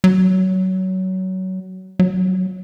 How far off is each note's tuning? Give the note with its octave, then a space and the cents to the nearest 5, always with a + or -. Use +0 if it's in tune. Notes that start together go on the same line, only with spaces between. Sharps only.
F#3 +20
F#3 +10